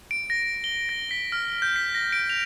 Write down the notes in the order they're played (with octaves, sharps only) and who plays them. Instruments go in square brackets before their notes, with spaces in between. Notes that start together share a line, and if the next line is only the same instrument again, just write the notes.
[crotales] D7
A#6
G7
A#6
B6
F6
G6
B6
A#6
D7
F7